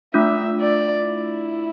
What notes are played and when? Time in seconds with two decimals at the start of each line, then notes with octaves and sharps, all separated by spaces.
0.14 A3 D4 F4 E5
0.60 D5
1.06 E4